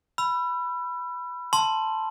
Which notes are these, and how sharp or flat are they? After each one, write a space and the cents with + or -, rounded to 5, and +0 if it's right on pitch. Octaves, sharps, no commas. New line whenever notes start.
B5 +0 E6 +35
A5 +0 C6 +0